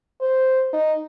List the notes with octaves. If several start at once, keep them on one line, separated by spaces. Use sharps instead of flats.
C5
D#4